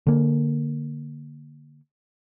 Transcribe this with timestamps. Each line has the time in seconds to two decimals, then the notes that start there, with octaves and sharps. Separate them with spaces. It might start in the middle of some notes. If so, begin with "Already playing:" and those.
0.07 D3 A#3